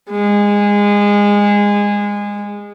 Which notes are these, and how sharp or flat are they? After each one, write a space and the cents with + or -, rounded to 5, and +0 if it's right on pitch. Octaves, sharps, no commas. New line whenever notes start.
G#3 -20